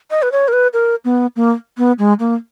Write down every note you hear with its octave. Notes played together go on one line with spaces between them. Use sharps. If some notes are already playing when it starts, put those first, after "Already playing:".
D#5
B4
C#5
A#4
B4
A#4
B3
A#3
B3
G#3
A#3